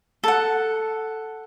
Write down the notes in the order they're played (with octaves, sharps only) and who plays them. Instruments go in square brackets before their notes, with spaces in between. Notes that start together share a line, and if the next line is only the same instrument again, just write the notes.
[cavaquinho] A4 F#5